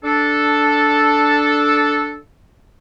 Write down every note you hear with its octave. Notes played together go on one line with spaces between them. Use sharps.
D4 A4